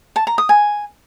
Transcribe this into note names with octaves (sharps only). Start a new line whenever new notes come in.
A5
A#5
D#6
G#5